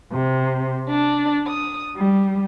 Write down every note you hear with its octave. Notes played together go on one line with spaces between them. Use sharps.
C3
D4
D#6
G3